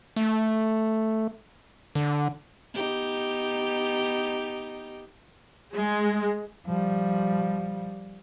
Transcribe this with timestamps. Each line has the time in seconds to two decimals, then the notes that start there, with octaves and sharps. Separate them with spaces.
0.16 A3
1.95 D3
2.74 B3 D#4 G4
5.74 G#3
6.66 F3 G3